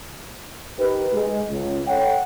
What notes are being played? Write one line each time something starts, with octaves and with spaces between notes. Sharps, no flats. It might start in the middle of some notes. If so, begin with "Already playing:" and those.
D#4 G4 A#4 B4
G#3
C#2
A4 C#5 F#5 G5